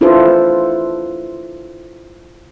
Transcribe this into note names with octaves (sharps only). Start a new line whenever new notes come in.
D4 E4 F4 A4 B4 C5